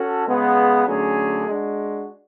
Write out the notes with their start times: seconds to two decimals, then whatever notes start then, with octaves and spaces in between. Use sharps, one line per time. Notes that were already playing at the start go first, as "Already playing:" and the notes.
Already playing: C#4 F#4 A4
0.27 C#3 G#3 B3
0.87 D3 F#3 A3 C#4 G#4
1.47 G#3 D4 F#4